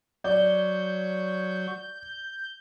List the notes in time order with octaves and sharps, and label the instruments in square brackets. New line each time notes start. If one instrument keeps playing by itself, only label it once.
[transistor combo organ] F#3 C#5 [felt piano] D5 [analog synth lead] G6